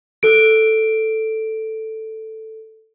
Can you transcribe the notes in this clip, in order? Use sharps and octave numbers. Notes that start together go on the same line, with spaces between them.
A4 D7